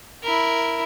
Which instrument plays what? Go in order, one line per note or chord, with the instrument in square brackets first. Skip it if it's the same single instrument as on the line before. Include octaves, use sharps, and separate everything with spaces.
[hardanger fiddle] E4 A#4